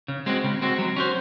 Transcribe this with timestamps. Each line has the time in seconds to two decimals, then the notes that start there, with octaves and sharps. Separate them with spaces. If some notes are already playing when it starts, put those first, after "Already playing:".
0.08 C#3
0.26 G#3 C4 F#4
0.44 C#3
0.61 G#3 C4 F#4
0.79 F#3
0.96 C#4 F#4 C5